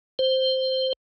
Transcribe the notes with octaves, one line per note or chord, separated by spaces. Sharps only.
C5